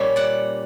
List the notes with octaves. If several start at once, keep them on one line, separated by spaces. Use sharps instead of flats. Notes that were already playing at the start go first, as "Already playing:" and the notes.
Already playing: A#2 G3 C#4 E5
D5 F#5